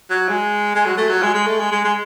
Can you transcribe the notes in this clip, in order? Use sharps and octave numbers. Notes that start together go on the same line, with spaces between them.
F#3
G#3
G#3
F#3
A3
F#3
G#3
G#3
A3
G#3
G#3
G#3